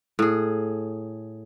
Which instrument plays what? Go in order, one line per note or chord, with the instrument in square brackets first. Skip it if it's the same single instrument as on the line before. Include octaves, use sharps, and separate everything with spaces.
[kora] A2 G#4